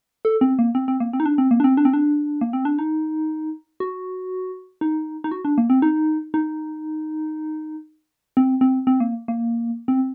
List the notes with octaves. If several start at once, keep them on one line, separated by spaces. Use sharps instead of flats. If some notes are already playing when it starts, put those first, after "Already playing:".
A4
C4
A#3
C4
C4
A#3
C4
D#4
D4
C4
A#3
D4
C4
D4
C4
D4
A#3
C4
D4
D#4
F#4
D#4
D#4
F#4
D4
A#3
C4
D#4
D#4
C4
C4
C4
A#3
A#3
C4